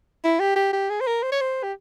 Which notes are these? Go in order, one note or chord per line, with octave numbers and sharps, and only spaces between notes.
E4
G4
G4
G4
G#4
C5
A#4
C5
C#5
C5
G4